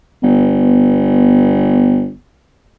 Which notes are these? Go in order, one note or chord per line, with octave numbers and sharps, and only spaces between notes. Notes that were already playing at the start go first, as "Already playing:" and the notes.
G1 B3